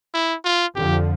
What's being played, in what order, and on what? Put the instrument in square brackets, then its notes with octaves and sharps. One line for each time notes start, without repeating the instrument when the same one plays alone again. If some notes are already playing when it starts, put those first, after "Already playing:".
[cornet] E4
F4
[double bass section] F2 D3 F3 [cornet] G4